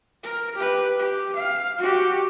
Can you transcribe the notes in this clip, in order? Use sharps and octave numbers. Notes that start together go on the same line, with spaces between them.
A#4
G4 B4
G4
F5
F#4 G4